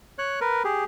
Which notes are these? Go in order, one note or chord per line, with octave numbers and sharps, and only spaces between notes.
C#5 F#6
A#4 B4
G4 G#4